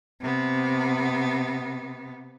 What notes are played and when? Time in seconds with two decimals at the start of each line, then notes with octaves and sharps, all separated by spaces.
0.21 C3 B3